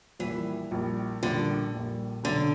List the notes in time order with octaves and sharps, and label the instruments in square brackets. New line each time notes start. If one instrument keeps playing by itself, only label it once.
[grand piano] A#1 A#2 G3 [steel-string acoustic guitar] E3
[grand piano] A#1 A#2 G3
[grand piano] A#1 A#2 G3 [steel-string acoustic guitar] D3
[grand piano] A#1 A#2 G3
[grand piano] B1 B2 F#3 [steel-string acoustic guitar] D3